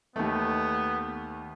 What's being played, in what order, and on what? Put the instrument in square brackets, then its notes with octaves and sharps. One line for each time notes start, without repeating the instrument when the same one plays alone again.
[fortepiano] D#2 A3 [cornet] B3